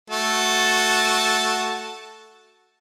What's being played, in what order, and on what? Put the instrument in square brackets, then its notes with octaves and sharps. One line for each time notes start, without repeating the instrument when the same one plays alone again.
[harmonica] A3 F#4 A5